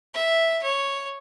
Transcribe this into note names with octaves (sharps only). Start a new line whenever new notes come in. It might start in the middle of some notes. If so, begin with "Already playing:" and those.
E5
C#5